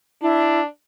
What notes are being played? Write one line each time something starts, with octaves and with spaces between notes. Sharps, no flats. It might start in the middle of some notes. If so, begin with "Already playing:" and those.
D4 E4